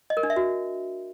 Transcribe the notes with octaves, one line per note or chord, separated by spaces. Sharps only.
D#5
A#4
D4
E5
F#4